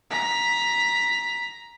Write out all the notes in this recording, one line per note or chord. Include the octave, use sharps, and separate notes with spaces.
A#5 B6